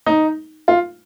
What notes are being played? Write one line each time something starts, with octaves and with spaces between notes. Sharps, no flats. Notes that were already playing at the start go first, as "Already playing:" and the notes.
D#4
F4